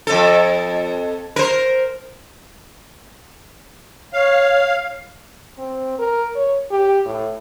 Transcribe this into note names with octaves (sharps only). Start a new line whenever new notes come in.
F2 A4
A#4 C5
C#5 F5
C4
A#4
C#5
G4
A2